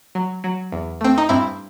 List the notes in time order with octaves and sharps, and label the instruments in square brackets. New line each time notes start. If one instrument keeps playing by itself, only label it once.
[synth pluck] F#3
F#3
E2
A3 C4
D#4
G2 C4 E4